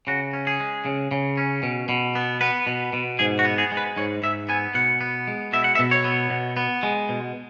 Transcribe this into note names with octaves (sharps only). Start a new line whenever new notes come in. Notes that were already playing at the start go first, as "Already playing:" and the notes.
C#3 F#4
C#4
G#4
G#3
C#3
C#3
C#4
B2
B2
B3
B3 B4
B2
B2
G#2 G#4
F#4
B3
G#4
G#3
B4
G#2 C#5
G#2 E5
B3 G#5
B2 F#5
B3
G#3
B2 E5
F#5
E5
B2
C#5
B3
B2
B3
G#3
B2